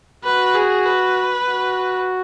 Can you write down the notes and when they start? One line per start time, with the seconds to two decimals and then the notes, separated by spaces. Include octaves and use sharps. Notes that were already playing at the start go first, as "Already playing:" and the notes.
0.24 F#4 B4
0.56 G#4
0.86 B4
1.48 F#4